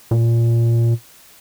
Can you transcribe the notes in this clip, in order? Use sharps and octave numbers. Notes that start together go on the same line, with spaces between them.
A#2